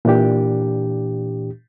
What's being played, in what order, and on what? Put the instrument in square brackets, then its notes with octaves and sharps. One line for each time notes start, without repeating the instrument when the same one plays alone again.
[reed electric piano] A#2 E3 D4 G4